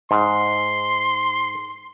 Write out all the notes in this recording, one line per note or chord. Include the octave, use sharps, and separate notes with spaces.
G#2 C6